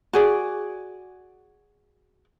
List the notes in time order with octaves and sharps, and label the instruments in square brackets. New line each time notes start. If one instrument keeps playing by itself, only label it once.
[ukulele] F#4 G#4 D5